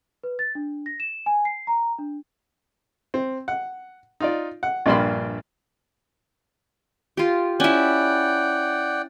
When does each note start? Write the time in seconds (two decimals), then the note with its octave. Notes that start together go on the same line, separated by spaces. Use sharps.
0.23 B4
0.39 A6
0.55 D4
0.86 A#6
1.00 E7
1.26 G#5
1.45 C7
1.67 A#5
1.99 D4
3.14 C4
3.48 F#5
4.20 D#4 F4 D5
4.63 F#5
4.86 A#1 G2 A#3 D5 B5 C6
7.17 F4 G4
7.60 C#4 E4 D5 F#5 G5